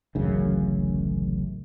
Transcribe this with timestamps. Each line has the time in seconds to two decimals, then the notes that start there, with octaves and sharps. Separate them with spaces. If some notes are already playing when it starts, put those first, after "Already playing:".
0.15 D1 A1 F#2 C#3